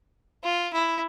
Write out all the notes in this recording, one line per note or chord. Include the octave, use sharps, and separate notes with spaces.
F4
E4